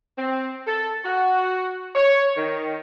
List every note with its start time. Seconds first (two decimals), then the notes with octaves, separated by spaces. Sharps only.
0.17 C4
0.66 A4
1.04 F#4
1.95 C#5
2.36 D#3